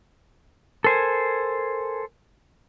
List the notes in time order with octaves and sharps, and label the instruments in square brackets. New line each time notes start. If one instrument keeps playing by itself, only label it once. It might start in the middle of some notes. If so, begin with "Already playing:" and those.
[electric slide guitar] A4 C5 [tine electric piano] A#4 G#5 G#6